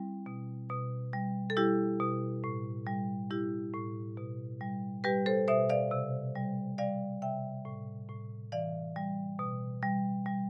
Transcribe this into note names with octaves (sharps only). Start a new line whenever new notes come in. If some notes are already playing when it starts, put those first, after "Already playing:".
Already playing: G3 C4 E4
B2
B2
G3
A4
G3 E4 G4
B2
A2
G3
G3 E4 G4
A2
B2
G3
G3 G4 B4
A4 C5
B2 C5 E5
D5 F5
C3
G3
G3 D5 F5
C3 E5 G5
A2
A2
E3 D5 F5
G3
B2
G3
G3